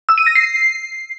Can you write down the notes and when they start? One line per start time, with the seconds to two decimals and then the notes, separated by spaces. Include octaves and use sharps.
0.09 E6
0.18 D#7
0.27 A#6
0.35 C7